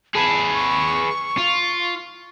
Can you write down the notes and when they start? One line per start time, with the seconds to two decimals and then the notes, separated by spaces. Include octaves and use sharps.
0.15 G#4 B4 A5
0.54 C#6
1.38 F4